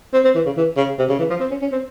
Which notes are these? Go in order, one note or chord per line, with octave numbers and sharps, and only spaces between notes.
C4
C4
E3
C#3
E3
C#3
C3
C#3
E3
F3
C4
C#4
C#4
C4